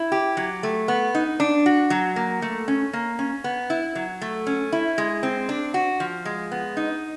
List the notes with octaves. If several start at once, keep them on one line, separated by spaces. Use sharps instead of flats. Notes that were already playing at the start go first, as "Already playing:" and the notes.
Already playing: E4
G4
F#3
A3
B3
D#4
D4
F#4
F#3
A#3
A3
C#4
A#3
C#4
B3
E4
F#3
A3
C#4
E4
G#3
C4
D4
F#4
F3
G#3
B3
D#4